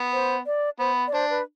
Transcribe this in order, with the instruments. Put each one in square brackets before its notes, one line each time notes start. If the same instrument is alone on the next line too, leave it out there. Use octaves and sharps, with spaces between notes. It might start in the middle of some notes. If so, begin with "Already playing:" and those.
Already playing: [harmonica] B3
[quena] C5
D5
[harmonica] B3 [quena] C5
[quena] D5
[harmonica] D4 [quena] C5
[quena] B4